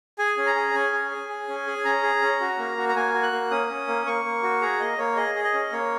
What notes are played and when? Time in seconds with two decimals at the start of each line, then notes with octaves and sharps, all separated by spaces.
0.18 G#4 G#5
0.37 C#4
0.46 A#5
0.55 G#4
0.74 C#4 G#5
0.92 G#4
1.11 G#4
1.29 G#4
1.48 C#4
1.67 G#4
1.85 C#4 A#5
2.03 G#4
2.22 C#4
2.41 F#4
2.58 A#3
2.77 F#4
2.89 A#5
2.96 A#3 G#5
3.14 F#4
3.23 F#6
3.32 A#3
3.51 C#4 D#6
3.69 C#4
3.88 A#3
4.06 A#3 C#6
4.25 A#3
4.43 F#4
4.61 G#4 A#5
4.80 A#3 D#5
4.98 A#3 C#5
5.17 G#4 D#5
5.35 G#4
5.44 D#5
5.54 C#4
5.72 A#3 C#5